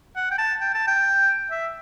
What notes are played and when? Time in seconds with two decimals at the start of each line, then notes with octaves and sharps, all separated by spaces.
0.16 F#5
0.31 G5
0.38 A5
0.60 G5
0.74 A5
0.88 G5
1.51 E5